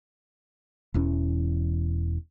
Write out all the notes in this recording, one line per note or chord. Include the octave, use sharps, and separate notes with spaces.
E1 E2 E3 C#4